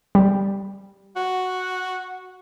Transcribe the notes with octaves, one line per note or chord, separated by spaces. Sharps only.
G3
F#4